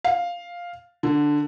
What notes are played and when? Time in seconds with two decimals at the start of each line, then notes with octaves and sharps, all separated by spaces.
0.04 F5
1.03 D3